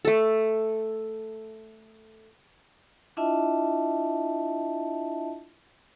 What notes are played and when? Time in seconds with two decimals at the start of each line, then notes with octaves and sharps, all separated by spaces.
0.05 A3 A4
3.17 D4 E4 F4 D#5 E5 A5